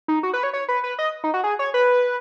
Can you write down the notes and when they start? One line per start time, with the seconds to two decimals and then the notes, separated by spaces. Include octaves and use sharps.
0.08 D#4
0.23 F#4
0.34 B4
0.43 C#5
0.53 C#5
0.68 B4
0.84 B4
0.99 D#5
1.24 D#4
1.34 F#4
1.44 G#4
1.59 C#5
1.74 B4